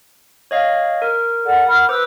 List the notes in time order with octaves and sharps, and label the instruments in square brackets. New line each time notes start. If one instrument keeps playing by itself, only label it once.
[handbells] C#5 D#5 F5
A#4
[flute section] A4 D5 F#5
F#5 B5 F6
[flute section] B4 E6 [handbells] C5 D6